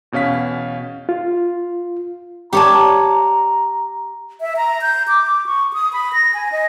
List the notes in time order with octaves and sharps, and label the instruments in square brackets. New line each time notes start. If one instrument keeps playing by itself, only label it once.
[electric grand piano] E2 B2 C#4 F5 B6
[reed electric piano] F4
[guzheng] G4 C#5 A5 [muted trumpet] A#5
[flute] E5
A#5
G6
D6
D6
C#6
D#6
B5
A#6
G#5
D#5